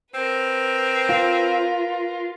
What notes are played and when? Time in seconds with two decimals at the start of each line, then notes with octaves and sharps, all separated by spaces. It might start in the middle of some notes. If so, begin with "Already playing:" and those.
0.14 C4 A#4 B4
1.09 F4